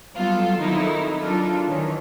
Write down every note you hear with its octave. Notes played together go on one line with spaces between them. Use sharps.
F#3 G3 B3 F4 A4
F2 D#3 F#3 D#4 E4
F#3 D4 F4 A4 A#4
D#3 E3 C#4